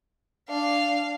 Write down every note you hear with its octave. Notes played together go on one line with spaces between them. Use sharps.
D4 F5